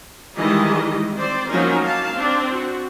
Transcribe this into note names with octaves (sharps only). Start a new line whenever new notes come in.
D#3 E3 G3 G#3 D#5
C4 C5 D5
F3 F#3 A#3 C#4 D#4 A#4
A#3 F5 A5
C4 D4
F#4